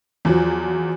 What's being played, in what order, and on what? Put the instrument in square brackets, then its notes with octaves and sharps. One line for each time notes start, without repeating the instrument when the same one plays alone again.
[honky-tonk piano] E2 F3 F#3